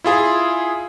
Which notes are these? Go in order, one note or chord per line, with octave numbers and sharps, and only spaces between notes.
E4 F4 G#4